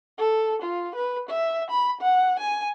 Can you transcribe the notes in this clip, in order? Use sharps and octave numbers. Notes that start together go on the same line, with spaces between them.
A4
F4
B4
E5
B5
F#5
G#5